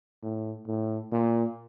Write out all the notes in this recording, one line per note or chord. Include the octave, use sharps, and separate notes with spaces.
A2
A2
A#2